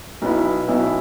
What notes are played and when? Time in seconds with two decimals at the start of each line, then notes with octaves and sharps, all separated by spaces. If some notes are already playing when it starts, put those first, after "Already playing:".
0.22 B1 B2 B3 E4
0.68 B1 B2 B3 E4